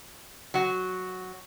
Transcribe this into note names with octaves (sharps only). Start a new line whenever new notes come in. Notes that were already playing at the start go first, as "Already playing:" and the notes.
F#3 F#4